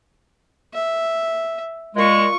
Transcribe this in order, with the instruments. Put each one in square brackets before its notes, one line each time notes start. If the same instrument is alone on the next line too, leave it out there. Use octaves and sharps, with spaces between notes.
[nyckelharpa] E5
[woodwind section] A#2 G#3 [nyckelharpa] F4 C#6